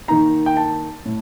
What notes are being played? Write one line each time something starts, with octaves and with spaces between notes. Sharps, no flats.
D#3 A#3 D#4 A#5
G5
A5
A2